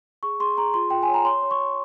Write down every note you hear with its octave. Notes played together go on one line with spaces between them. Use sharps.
G#4 C#6
G#4 C6
G#4 A#5
F4 C6
F4 G5
G#5
C#5
A#5
C#5 C6
C#5
C#6
C#5